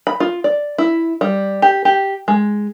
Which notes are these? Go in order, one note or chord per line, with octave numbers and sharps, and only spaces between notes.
B5
F4
D5
E4
G3
G4
G4
G#3